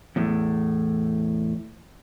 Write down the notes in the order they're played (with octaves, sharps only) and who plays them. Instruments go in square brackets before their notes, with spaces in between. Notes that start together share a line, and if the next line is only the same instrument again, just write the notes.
[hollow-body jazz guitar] E2 A2